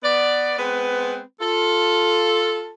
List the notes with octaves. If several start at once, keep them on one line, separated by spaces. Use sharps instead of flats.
B3 D5
G#3 B3 C4 B4
F4 A4